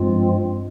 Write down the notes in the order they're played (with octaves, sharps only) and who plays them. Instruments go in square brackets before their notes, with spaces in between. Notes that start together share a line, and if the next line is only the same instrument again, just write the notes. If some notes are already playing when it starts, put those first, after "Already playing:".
Already playing: [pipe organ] G2 F3 G#3 C4 F4